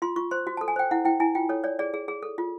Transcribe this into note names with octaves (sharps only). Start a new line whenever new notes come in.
F4 C6
F4 C#6
C5 C6
F#4
A4 A5
G#5
C5 G5
E4 F#5
E4 G5
E4 G#5
F4 G5
A4 C#5
C#5 D5
G#4 D5
G#4
G#4
A4
F4